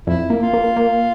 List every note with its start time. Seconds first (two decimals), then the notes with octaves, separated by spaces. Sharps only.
0.07 F2 E4
0.30 A#3
0.42 F4
0.53 A#3
0.76 A#3